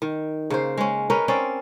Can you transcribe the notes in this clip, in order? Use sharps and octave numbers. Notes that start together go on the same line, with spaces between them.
D#3
C#3 A#3 C5
G#3 C#4
C#4 D#4 A#4 B4
C4 C#4 D5